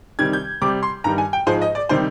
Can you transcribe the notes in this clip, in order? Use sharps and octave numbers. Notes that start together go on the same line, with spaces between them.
C3 D#3 G3 G#6
G6
C3 G3 D6
C6
G2 D#3 G3 A#5
G#5
G5
G#2 F3 G#3 C5
D#5
D5
C3 D#3 G3 C5